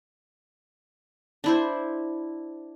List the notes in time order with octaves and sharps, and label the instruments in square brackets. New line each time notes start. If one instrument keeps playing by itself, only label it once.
[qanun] D4 E4 C5